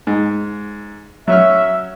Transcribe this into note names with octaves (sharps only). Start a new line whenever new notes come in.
G#2
F#3 C#4 E5 F6